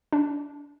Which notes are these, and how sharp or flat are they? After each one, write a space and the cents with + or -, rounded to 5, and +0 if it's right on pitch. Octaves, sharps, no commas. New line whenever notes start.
D4 -20